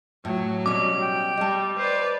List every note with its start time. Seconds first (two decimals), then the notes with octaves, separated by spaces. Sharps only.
0.25 A2 F#3
0.66 B2 G3 C#4 D6
1.02 G5
1.37 G3 D#5 A5
1.78 B4 C5 D5